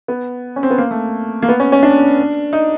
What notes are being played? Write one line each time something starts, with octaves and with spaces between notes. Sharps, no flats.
B3
C#4
C4
B3
A#3
A3
A#3
B3
C#4
C#4
D4
D#4